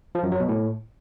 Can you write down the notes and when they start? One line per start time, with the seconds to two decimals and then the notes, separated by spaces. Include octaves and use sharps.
0.15 F3
0.23 F#2
0.32 F#3
0.40 B2
0.49 A2